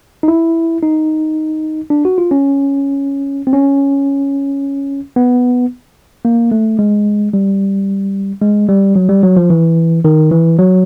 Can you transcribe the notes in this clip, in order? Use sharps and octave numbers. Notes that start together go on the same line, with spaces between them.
D#4
E4
D#4
D4
F#4
F4
C#4
C4
C#4
B3
A#3
A3
G#3
G3
G#3
G3
F#3
G3
F#3
F3
E3
D#3
E3
F#3